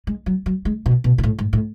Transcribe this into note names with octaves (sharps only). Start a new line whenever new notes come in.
G#3
F#3
F#3
G#3
B2
B2
B2
A2
G#2
A2